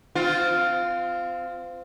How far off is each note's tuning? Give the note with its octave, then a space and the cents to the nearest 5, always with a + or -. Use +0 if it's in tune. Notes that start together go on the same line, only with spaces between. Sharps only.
C4 -25 F4 +0